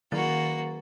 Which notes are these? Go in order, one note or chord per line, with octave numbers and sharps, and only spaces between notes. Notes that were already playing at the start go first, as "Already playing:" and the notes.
D#3 F#3 A#3 F#4 A6